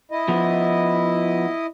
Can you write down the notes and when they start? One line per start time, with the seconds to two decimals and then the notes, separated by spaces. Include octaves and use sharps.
0.11 E4 D#5
0.28 F3 B3